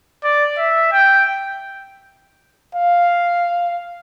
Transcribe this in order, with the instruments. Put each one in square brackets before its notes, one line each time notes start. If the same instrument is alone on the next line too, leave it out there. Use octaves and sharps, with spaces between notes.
[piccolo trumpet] D5
E5
G5
[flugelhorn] F5